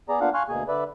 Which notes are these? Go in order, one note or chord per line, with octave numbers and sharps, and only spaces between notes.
B3 G#4 D5 A#5
A#3 B3 D4 F4 F5 F#5
F5 G#5 C6 C#6 F6 F#6
D2 B2 A#3 G#4 G#5
D3 B4 D5 E5